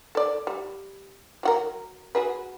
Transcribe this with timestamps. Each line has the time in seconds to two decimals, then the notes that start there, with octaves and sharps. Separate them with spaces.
0.15 A4 D5
0.47 G3
1.43 F#3 F#4 A#4
2.15 F#4 G#4 B4